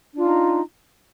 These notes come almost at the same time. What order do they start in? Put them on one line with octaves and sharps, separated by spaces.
D4 F4 D#4